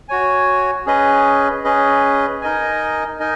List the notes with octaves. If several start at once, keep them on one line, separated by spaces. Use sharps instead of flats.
F#4 C#5 G#5
C#4 G#4 B4 D#5
C#4 G#4 B4 D#5
D#4 A#4 D#5 G#5
D#4 A#4 D#5 G#5